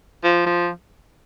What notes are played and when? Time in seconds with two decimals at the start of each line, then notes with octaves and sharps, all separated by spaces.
0.24 F3
0.46 F3